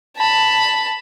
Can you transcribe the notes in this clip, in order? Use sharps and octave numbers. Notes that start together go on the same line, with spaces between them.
A5 B5